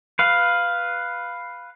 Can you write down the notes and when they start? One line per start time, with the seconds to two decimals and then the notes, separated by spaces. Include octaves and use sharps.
0.19 B4 F5